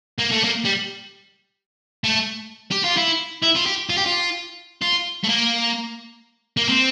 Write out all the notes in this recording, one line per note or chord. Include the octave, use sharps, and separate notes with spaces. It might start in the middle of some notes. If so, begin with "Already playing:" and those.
A#3
A3
A#3
G3
A3
G4
F4
E4
E4
F4
G4
F4
G4
F4
F4
A3
A#3
A#3
C4